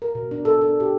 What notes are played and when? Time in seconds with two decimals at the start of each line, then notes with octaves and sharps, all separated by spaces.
0.02 A#4
0.15 B2
0.31 D4
0.45 A4
0.61 D4
0.80 G4